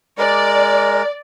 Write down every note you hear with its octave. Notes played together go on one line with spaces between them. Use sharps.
G#3 A#4 D5